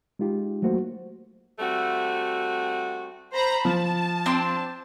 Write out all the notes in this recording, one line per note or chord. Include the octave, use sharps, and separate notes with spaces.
G#3 D#4 F4 G4
F#3 A3 A#3 F#4 C5
G3 A3 C4 F#4
C5 A#5 B5
F3 A5
C4 D4 C6